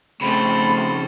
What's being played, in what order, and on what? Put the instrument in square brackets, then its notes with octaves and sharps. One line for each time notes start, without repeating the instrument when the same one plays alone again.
[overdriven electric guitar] F2 C#3 [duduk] A3 [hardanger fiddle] C4 A4 [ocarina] B5